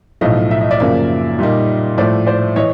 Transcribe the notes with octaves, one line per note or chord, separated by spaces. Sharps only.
B1 A2 F3 A3 D#5 F5
E5
D#5
D5 E5
F#2 C#3 F3 A#3
A#2 G3 A#3 D#4
A2 F3 A3 C5 D5
C5 D5
E3 C#5 D#5